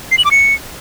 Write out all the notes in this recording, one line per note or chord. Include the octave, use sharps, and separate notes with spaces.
C7
F#7
D6
C#7